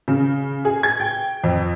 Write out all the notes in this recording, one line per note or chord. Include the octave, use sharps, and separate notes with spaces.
C#3
G#4
G#6
G5
F2